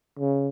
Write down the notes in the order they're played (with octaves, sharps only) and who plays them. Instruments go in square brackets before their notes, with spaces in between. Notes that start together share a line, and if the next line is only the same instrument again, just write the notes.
[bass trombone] C#3